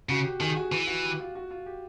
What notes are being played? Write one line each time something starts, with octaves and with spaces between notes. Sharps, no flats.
C#3 F#4
G4
D#3 G#4
F#4
E3
F#4
G4
F4
F#4
F4
G4